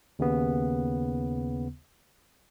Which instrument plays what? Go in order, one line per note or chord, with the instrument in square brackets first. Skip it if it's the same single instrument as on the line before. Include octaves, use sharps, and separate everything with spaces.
[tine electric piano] D#2 C#3 B3